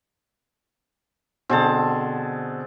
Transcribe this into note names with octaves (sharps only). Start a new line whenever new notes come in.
B2 D3 C4 G#4 A5